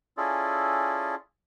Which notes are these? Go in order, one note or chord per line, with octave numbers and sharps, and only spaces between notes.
C#4 E4 F4 G#4 A4 D5